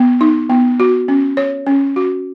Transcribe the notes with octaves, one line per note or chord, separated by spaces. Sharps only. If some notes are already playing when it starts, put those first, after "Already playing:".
Already playing: B3
D#4
B3
F#4
C#4
C#5
C#4
F#4